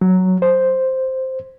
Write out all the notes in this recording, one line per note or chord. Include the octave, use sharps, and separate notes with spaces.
F#3
C5